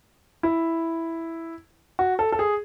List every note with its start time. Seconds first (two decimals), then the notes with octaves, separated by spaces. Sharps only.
0.43 E4
1.99 F#4
2.19 A4
2.32 A4
2.39 G#4